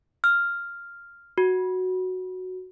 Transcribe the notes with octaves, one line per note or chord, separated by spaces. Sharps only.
F6
F#4